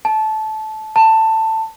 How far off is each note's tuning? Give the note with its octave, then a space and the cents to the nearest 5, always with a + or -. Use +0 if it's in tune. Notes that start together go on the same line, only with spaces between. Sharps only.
A5 -20
A5 +15